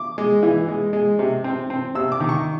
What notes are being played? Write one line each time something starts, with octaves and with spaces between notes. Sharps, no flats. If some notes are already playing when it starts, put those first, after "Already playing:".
Already playing: D6
G#3
E3
G#3
G#3
C3
C4
C4
C3 E6
D6
D#3
C#6